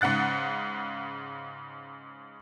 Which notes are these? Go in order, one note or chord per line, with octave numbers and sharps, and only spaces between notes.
G#2 C#3 F#5 F#6 A6